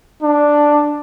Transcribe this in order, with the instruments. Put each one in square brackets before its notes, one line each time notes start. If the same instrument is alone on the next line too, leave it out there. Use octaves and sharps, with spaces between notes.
[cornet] D4